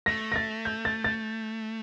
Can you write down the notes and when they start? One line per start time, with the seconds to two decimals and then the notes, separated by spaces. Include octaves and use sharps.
0.06 A3 A#6
0.32 A#6
0.36 A6
0.65 G6
0.85 A6
1.04 A6